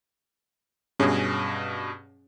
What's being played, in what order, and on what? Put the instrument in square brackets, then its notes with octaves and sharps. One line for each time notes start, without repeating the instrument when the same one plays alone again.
[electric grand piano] G2 B2 [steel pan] C#4 G#4